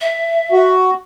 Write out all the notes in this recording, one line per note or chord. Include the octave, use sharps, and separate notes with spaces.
E5
F#4